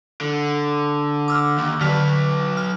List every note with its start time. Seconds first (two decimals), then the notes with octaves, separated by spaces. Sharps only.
0.21 D3
1.28 D6 E6 F6
1.58 D#2
1.81 D3 F#3 B4 F6 B6
2.57 F6